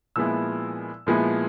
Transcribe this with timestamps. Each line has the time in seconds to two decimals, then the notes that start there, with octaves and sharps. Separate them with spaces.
0.16 A#2 F3 G#3 B3 E4 E6
1.07 A#2 F3 G#3 B3 E4